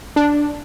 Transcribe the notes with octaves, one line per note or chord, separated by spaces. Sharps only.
D4